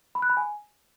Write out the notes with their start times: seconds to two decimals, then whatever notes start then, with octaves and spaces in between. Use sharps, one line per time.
0.15 B5
0.22 F#6
0.30 B5
0.37 G#5